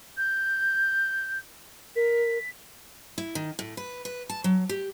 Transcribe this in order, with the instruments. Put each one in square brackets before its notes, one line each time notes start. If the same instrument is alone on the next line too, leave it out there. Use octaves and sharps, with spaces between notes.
[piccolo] G6
[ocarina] A#4 [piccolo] B6
[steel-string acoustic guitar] E4
D#3
A2
B4
B4
A5
F#3
G4